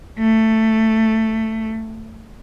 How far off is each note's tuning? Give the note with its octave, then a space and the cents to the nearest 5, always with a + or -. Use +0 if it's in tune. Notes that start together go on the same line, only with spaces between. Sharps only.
A3 +10